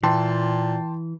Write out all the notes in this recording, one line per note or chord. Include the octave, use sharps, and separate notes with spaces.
A#2 E3 G5 A5 C6